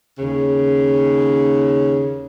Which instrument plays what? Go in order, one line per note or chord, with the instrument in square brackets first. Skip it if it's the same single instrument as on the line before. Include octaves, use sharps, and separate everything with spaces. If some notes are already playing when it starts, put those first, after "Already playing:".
[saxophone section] D#2 C#3